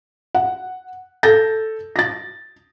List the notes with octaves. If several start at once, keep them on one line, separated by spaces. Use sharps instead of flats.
F#5
A4 G6 A6 A#6
A6 A#6